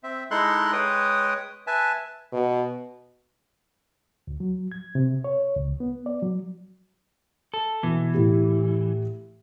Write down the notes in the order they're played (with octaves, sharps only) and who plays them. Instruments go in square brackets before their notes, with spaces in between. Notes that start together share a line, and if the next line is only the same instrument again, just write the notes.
[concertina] C4 E5
G#3 D#4 E4 A4 C6 F#6
G#3 B4 C#5 G5 D#6
B4 E5 G#5 A5
[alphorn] B2
[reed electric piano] D2
F#3
G#6
C3
C#5
C#2
B3
D5
F#3
[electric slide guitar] A4
[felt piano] B2 [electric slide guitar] E3
[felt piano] A2 G4